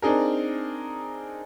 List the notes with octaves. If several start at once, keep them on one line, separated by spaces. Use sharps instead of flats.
C4 D4 D#4 G#4 A#4